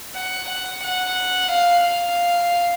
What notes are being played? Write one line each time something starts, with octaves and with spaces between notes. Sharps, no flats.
F#5
F#5
F#5
F5
F5